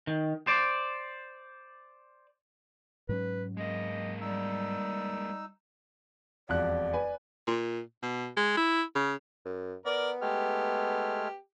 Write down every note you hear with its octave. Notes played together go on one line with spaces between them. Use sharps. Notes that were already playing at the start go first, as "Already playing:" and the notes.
D#3
C5 D5
G#2 F#3 C#4 B4
G#3 A#3 D#5
G3 D#4 E6
E1 F2 D5 F#6
B4 G#5
A#2
B2
G#3
E4
C#3
F#2
B3 A#4 D5
G#3 A3 G4 F6